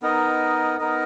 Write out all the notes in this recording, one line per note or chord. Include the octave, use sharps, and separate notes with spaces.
B3 D#4 A#4 D#5
B3 D#4 A#4 D#5